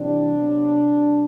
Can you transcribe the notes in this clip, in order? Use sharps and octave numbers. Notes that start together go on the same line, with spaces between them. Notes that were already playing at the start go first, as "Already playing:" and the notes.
Already playing: C3 E3 G3 C4 D4
C3 F#3 B3
C3 G3 C4